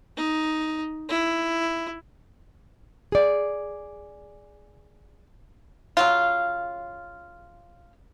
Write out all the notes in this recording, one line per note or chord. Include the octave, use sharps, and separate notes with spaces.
D#4
E4
G#4 D5
C#3 F#3 F4